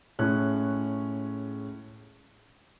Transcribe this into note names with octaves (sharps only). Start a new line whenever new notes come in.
A2 G#3 C#4 F#6